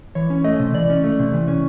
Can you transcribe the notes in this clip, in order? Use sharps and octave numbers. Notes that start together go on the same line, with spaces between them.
E3 C#5
C#4
A3 D#5
C3
E3 D5
C#4
A3
C3
E3
C#4